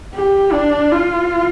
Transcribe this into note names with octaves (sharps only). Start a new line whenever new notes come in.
G4
D4
F4